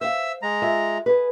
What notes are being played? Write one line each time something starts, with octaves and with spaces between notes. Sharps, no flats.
C5 E5 F5 E6
G#3 A#5
F4 G#4 E5
G#4 B4